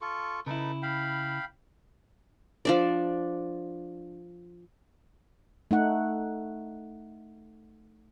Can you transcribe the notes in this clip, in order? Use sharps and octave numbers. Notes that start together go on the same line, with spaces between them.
F4 A4 C#6
C#3 D#4 E4 A4 B4
F5 G5 B5
F3 D4 D5
A3 D#4 F#5